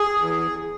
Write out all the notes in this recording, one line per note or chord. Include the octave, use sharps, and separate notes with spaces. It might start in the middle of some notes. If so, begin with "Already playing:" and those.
Already playing: G#4
E2